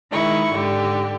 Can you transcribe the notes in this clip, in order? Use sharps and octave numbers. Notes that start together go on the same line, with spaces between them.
D#3 G#3 E4 C#6
G#2 D3 G4